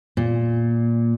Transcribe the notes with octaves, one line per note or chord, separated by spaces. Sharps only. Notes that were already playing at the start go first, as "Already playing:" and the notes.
A#2